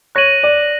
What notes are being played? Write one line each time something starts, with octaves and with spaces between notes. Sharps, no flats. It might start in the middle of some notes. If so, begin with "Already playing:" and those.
C#5 F#6 A#6 D#7 F#7
D5